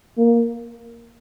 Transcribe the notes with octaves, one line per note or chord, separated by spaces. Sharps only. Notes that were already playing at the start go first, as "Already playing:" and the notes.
A#3